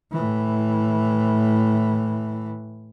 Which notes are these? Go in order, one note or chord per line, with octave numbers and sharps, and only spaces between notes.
A2 E3